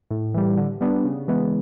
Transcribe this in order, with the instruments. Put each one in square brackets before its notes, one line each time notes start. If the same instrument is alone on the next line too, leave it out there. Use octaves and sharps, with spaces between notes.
[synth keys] A2
E3 G3
D3
G3 B3 D4
C#3
E3 G#3 B3